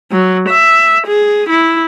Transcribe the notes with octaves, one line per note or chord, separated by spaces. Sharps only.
F#3
E5
G#4
E4